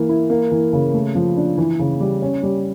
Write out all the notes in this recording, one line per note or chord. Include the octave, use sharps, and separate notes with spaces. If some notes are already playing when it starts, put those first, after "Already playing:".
Already playing: E3 A#3
E4
A#3
E3
C#3
A3
F3
D4
E3
C#3
G3
C#4
G3